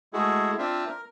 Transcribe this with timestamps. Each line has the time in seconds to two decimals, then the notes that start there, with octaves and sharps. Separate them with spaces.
0.13 G#3 A3 E4 F#4 G#4
0.58 C4 D4 F4 E5
0.87 A#4